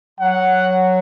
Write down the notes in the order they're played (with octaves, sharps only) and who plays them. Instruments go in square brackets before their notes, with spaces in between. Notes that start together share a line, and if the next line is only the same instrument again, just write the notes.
[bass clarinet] F#3 [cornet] F#5